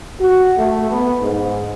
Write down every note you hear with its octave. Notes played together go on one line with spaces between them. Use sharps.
F#4
A3
B3
G#2